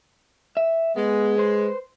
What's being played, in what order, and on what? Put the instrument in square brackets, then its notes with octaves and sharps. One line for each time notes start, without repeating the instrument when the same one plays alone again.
[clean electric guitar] E5
[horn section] G#3 [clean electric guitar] B3
[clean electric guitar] B4 C5